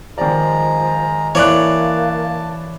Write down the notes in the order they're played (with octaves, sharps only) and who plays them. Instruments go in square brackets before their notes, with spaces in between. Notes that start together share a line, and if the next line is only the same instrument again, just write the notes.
[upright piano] D#3 D5 [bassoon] F3 [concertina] G#3 A#5
[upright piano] E3 F#6 [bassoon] A#3 [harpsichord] C#5 D5 [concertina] A5